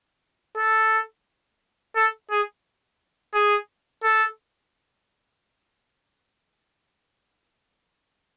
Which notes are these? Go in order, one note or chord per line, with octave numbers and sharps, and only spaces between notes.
A4
A4
G#4
G#4
A4